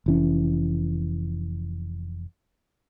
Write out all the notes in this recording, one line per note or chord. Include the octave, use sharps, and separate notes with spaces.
F1 E3 C#4